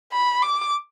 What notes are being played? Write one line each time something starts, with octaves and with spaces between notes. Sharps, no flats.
B5
D6